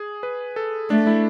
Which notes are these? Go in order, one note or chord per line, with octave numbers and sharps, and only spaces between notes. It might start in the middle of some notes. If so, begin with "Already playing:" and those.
Already playing: G#4
B4
A4
A3 D4
E4